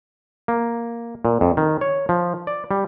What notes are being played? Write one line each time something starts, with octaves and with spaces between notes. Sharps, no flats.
A#3
A#2
F2
D#3
C#5
F3
D5
G3